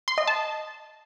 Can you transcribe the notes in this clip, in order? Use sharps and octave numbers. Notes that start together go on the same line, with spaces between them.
C6
D#5
A5